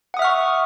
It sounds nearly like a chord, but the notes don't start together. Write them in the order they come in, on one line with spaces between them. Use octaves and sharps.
F#5 D#6 E5 F6 C#6